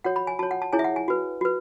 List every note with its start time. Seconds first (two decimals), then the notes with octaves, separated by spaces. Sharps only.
0.04 F#4 C#5 F#5
0.16 B5
0.27 G#5
0.39 F#4 C#5 A5
0.51 F#5
0.62 A5
0.73 E4 G#4 C#5 G#5
0.79 E5
0.84 F#5
0.96 G#5
1.08 F#4 B4
1.41 F#4 B4